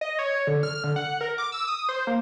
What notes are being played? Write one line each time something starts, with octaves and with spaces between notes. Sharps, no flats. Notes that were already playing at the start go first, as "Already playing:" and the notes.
D#5
C#5
D3
F6
D3
F#5
A#4
D6
E6
D#6
C5
A#3